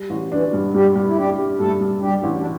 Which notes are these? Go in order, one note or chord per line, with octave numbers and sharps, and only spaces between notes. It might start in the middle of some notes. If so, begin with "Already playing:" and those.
Already playing: G3
A1
E3 D4
G2
G2 G3 G4
G2
E4
G3 D4 G4
G3
G2 A3 A4
G2
G3 D4 G4
A1
D4